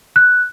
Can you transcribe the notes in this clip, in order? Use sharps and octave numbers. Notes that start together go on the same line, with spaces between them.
F#6